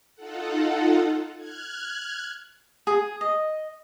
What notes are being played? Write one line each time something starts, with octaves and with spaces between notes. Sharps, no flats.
D#4 F4 A4 F#5
F6 F#6 G#6
G#4
D#5